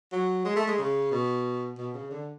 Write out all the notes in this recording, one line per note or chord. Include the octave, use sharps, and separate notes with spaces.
F#3
G#3
A3
G#3
C#3
B2
B2
C#3
D3